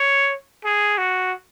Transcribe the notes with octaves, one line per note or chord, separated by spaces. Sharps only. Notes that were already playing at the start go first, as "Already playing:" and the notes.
Already playing: C#5
G#4
F#4